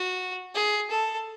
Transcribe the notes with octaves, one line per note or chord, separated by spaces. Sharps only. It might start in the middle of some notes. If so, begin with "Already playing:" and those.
Already playing: F#4
G#4
A4